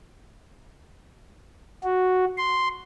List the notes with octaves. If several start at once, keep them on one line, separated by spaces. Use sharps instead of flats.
F#4
C6